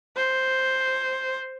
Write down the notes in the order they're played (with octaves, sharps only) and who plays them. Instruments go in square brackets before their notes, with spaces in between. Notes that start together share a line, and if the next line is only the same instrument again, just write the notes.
[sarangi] C5